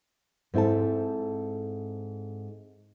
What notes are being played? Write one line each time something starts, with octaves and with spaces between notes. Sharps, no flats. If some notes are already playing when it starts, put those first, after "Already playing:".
G#2 C4 E4 A4 A5